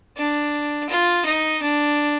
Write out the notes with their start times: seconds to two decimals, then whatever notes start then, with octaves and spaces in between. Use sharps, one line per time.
0.17 D4
0.89 F4
1.25 D#4
1.62 D4